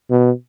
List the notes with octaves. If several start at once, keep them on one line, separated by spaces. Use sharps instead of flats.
B2